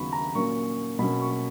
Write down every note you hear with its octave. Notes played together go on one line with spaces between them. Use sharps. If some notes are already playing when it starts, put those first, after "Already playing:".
Already playing: D#2 C#3 F#3 B3 B5 C#6
A#5
A#2 F#3 A#3 C#4 C#6
B2 F#3 A#3 C#4 B5
C#6